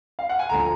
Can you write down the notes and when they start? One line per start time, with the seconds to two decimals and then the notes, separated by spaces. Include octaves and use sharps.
0.19 F5
0.29 F#5
0.39 G#5
0.49 D2 D3 F3 A#5